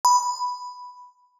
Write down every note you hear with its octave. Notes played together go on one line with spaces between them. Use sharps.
B5